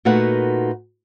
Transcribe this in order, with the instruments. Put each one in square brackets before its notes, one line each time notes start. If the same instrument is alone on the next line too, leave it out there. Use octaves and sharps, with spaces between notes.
[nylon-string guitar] A#2 A3 D#4 F#4 B4 F#5